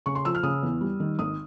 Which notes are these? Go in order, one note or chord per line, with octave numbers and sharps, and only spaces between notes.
C#3 C#6
C6
F3 E6
F6
C#3 D#6
E2
G3
D#3
G#1 D#6